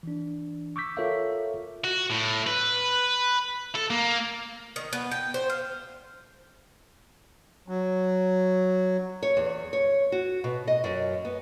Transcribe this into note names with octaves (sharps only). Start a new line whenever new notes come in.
E3 D4
C#6 D6 E6 G6 B6
F4 A4 A#4 C#5 E5 F5
F#4
A2
B4
A4
A#3
D#3
B3
G5
C5
F5
F#3
C#5
E2
C#5
F#4
B2
D#5
F#2
B3